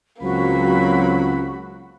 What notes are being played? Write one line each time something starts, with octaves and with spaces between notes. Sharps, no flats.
C#2 F#3 A#3 C4 F#4 B5